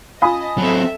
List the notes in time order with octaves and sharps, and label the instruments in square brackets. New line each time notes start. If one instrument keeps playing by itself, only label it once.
[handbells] F4 F5 [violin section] D#5 A5 [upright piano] G#5 B5 D#6
[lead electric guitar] F#3 C4 [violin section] A4 E5